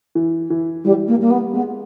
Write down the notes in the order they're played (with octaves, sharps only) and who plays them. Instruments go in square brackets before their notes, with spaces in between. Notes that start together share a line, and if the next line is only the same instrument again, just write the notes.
[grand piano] E3
E3
[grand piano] E3 [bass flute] G3
[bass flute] A#3
[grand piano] G3 [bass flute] A#3
[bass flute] B3
[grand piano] G#3 [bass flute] B3